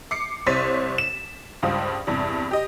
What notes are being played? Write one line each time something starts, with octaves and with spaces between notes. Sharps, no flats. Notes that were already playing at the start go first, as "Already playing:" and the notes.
D6 C7 C#7
C2 C5 C#5 A6 B6 D#7
E7
C#2 G2 F4 C5 D#6
E2 G2 C3
G4 D#5